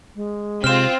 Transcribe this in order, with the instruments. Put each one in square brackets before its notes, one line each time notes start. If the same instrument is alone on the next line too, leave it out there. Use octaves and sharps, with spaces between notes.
[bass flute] G#3
[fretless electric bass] C3 [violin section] C4 F4 [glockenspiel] F6 E7